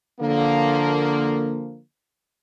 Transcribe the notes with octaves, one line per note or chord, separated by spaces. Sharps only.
D3 F3 A#3